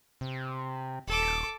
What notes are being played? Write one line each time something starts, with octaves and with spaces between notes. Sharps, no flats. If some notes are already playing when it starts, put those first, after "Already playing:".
C3
D#1 A4 D6